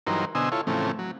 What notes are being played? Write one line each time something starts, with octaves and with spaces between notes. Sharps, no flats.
G2 E3 F#3 D#4 A#4 C5
B2 D3 C5 D#5 G#5 E6
E4 F4 A4 C#5
A2 C#3 E3 F3 A3 C4
F#3